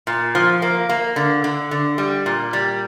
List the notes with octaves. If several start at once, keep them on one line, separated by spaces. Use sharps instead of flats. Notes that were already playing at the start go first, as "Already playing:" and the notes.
A#2
F3
A#3
A#3
D3
D3
D3
G3
A#2
G3